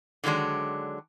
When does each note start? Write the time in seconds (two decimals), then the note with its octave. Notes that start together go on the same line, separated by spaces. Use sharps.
0.24 D3 D#3 F#3 G#3 D4